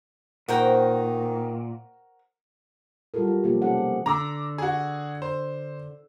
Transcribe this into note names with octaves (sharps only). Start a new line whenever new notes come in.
A#2 D#3 F#4 A#4 C5 G5
G3 G#3 F4 F#4 A4 A#4
F#3 F4
B2 F3 F#3 A#3 F4 G4
C3 C#4 D#4 G4 A4 F#5
G#4
D3 A#5 D6 E6
F#4 G#4
C5